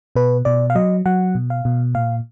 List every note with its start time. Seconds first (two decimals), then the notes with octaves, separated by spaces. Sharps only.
0.16 B2 B4
0.45 B2 D5
0.70 F5
0.75 F#3 D#5
1.06 F#3 F#5
1.35 B2
1.50 F5
1.65 B2
1.95 A#2 F5